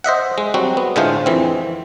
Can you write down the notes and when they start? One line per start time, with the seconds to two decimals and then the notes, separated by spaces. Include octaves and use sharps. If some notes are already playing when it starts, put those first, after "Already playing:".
0.04 C5 D#5 E5 F#5
0.38 G#3
0.54 F#3 G3 C4 F#4
0.77 B3
0.96 A2 D3 G#3 A3 F4 C5
1.26 F2 E3 C4